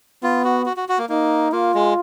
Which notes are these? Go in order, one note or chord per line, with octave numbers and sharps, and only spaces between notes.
B3 F4
F#4
F#4
F#4
F#4
A#3
A#3 D#4
A#3 F4
G#3